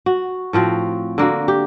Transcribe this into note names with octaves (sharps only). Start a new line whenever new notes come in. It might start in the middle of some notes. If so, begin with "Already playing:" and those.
F#4
A2 F3 C4 F#4
D3 A#3 F#4
G4